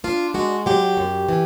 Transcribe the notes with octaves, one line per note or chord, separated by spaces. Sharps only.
D4 F4
G#3 F#4
F#3 G4
F#2
E3